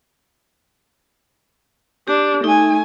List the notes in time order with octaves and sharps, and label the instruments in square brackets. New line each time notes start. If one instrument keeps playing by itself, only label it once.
[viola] D4 [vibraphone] G4
[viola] A3 G#5 [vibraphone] D#4